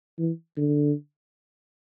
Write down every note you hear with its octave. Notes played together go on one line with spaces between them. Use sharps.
E3
D3